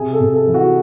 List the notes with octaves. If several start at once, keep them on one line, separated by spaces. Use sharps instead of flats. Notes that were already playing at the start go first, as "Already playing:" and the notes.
Already playing: C3 G#4
A4
C3
A4
E3
F#4